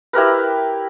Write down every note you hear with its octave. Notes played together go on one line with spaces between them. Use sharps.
E4 G4 A#4 B4